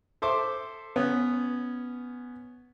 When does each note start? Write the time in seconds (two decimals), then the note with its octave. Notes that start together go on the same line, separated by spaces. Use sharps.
0.22 A4 C5 E5 D6
0.96 B3 C#4